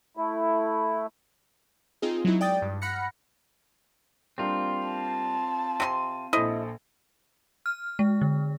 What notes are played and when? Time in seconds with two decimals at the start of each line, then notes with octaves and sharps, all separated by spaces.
0.17 A3 E4
2.02 C4 D#4 F4 G#4
2.25 F#3 G#3 D#4 E4
2.41 D5 G5 D#6 A6
2.62 G2
2.82 F#5 B5 F6 F#6 A#6 C#7
4.38 G3 A#3 C4 D4 F4
4.88 A5
5.80 C3 D#4 C6 D#7
6.33 A#1 E4 A4 C5 D#5
7.66 F6
7.99 G#3
8.21 D3